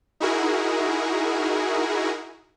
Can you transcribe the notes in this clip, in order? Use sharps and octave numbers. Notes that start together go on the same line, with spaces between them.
D#4 E4 F#4 G#4 A#4